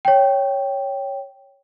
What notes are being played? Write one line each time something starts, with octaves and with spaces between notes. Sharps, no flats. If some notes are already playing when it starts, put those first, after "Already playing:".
C#5 G5